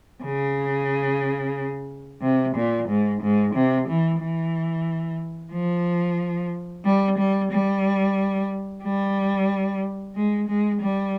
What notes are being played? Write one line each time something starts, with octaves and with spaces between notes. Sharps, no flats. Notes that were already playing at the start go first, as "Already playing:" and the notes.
C#3
C3
A#2
G#2
G#2
C3
E3
E3
F3
G3
G3
G3
G3
G#3
G#3
G3